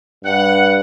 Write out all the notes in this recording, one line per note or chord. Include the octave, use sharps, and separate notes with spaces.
G2 F#5